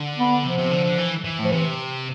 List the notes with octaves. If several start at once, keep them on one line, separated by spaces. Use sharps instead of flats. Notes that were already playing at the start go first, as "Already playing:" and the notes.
Already playing: D3
B3
C3 F3
C3
D3
D3
E3
E3
A2
F3
C3 E3